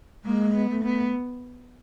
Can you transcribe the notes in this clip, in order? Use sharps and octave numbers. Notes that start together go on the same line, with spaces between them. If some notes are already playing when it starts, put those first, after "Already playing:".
G#3 A#3
B3
A3
B3